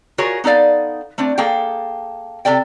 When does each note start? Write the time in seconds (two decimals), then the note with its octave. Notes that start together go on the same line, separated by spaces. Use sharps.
0.18 F4 F#4 G#4 A#4 C#5
0.44 B3 D#4 A4 D5 F5
1.18 A3 C4 D4
1.38 A#3 G#4 A4 G5
2.45 C3 A4 D5 G5